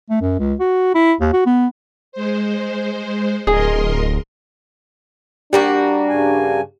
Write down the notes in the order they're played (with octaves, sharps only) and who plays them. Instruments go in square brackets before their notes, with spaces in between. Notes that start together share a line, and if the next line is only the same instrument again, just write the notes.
[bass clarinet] A3
F#2
C#2
F#4
E4
D#2
F#4
B3
[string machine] G#3 C5
[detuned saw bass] D1 [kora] G#4 [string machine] A#4 D#5 C6
[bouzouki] G3 A#3 F#4 [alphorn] D4 [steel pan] G4
[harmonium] G2 C#3 G#5